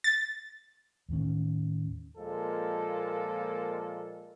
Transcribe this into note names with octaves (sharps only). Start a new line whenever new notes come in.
A6
D#2 A2 D#3 C#4
A#2 F3 G#3 A#3 A4